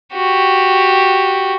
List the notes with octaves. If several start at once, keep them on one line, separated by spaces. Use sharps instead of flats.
F#4 G4